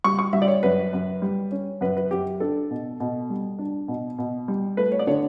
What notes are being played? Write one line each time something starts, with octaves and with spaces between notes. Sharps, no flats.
G3 C#6
C#6
G3 E5
D5
C#5
F#2 B4
F#2
G3
C#4
F#2 B4
B4
F#2 G4
D4 A4
B2
B2
G3
D4
B2
B2
G3
A3 B4
C#5
D5
D3 C#5